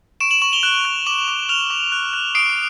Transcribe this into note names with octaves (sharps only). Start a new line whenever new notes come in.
C#6 D7 E7
E7 F#7
C#6 E7 F#7
F7 G7
F#6 E7 F#7
F#6
D6 E7 F#7
D6
F6 F7 G7
D6
F#6
F#6
D#6 C7 D7